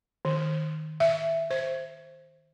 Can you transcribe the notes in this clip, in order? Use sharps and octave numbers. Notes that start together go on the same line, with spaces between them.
D#3
E5
C5